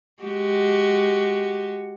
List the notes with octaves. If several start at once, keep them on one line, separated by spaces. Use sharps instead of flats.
G#3 F#4 G4